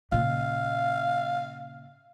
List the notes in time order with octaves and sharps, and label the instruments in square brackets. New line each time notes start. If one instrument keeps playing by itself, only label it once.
[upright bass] A#2 C#3 [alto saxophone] F5